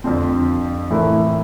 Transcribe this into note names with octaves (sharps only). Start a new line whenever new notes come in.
F2 D3 F3 C4
A2 E3 A3 E4 A#4